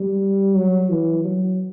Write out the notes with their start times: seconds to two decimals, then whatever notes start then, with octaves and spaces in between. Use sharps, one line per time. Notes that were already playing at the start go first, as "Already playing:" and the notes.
Already playing: G3
0.54 F#3
0.90 E3
1.25 F#3